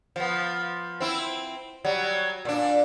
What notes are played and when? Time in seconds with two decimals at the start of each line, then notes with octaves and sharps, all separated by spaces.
0.16 F3 B3
1.00 C4 E4
1.84 F#3 G3
2.45 A#2 D4